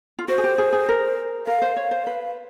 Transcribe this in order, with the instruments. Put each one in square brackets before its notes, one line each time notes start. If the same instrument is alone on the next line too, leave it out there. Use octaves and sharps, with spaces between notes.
[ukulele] F4
[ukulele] F#4 [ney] C5
[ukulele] G#4
G4
G#4
G#4
A#4
[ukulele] A#4 [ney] F5
[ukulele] C5
C#5
C5
B4